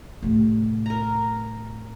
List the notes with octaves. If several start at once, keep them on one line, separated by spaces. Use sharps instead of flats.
A2 C3
A#4 A#5